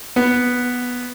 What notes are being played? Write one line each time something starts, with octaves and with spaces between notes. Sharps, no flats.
B3